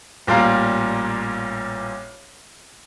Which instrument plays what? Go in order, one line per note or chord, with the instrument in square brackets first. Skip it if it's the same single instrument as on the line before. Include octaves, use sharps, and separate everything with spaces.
[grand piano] A1 A#2 G3 F5 A#5